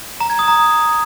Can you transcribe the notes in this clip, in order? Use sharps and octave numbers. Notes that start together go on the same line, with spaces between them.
A#5
G#6
D#6
A#5